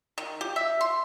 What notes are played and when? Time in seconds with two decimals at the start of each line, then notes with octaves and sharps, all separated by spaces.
0.18 D#3
0.41 G4
0.56 E5
0.81 C6